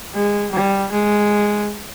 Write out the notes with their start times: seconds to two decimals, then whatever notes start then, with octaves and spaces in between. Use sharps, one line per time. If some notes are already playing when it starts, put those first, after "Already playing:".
0.14 G#3
0.52 G3
0.92 G#3